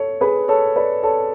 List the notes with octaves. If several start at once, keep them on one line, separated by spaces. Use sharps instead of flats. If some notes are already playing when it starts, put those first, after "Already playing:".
Already playing: A4 C#5
G#4 B4
A4 C#5
B4 D5
A4 C#5